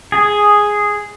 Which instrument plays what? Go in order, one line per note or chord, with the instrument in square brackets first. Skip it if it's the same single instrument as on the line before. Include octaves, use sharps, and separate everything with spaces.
[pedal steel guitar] G#4